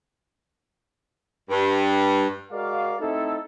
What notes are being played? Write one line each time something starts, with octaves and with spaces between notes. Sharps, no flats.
G2
G#3 F#4 A#4 D5 F5
A3 C4 D#4 E4 A4